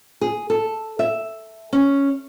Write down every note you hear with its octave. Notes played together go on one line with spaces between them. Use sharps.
G#4
A4
E5
C#4